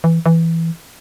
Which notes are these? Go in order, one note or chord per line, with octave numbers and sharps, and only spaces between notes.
E3
E3